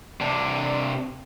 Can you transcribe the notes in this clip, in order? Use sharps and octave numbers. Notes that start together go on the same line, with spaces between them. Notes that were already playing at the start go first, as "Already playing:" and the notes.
C3 D4